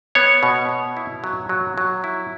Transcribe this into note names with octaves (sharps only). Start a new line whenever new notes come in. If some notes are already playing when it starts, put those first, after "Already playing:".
B3 C#5
B2
B3
E4
F#3
F#3
F#3
E4